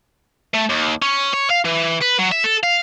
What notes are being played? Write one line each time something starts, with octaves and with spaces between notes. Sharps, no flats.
A3
D#2
C#4
C#5
F5
E3
B4
F#3
E5
A4
F5